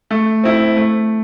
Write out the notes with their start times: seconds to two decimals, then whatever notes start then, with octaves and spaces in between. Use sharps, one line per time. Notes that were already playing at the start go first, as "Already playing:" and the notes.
0.11 A3
0.44 C4 E4
0.77 A3